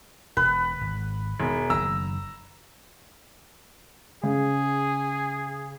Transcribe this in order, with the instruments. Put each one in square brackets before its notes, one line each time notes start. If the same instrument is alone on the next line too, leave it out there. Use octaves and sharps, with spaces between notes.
[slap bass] E1 [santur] B4
[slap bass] G#1
[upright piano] E1 [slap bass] D#3
[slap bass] F#1 D#3 [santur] A#5 [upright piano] E6
[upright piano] C#3 [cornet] G#4